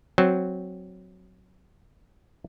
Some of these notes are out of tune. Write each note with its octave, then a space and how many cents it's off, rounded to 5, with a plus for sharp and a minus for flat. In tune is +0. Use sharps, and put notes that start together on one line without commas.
F#3 +0 C4 +0